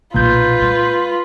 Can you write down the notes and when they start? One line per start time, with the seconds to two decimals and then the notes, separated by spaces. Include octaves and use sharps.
0.14 B1 F2 A#2 F4 B4 G6
0.61 G#3